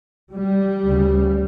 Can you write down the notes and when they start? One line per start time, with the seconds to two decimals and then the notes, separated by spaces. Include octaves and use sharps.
0.35 G3
0.84 D2 C#3